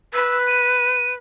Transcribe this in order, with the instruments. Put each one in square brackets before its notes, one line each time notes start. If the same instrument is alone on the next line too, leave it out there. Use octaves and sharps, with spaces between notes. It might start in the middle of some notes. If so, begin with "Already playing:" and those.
[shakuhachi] B4 [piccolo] E6
[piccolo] D#7